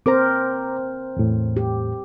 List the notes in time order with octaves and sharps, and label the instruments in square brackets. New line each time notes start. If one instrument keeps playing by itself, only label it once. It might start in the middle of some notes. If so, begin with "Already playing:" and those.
[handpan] C4 A#4 C5 [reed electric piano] A#5 D6
[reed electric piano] E2 A2
[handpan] G4